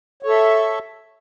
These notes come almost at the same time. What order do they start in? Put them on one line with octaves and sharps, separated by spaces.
C#5 A4 E5